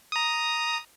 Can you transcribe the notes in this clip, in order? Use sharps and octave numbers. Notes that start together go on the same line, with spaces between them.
A#5 D#6